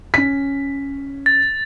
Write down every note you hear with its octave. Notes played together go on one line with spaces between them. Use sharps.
C#4 B6
A6